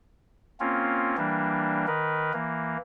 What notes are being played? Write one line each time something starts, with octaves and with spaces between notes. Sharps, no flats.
A#3 C4 C#4 F4
E3 G3 A#3 D4
D#3 A#4 B4
E3 A#3